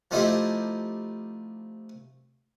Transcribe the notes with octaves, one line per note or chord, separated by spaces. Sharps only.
F3 A3 C4 D#4 E4 G4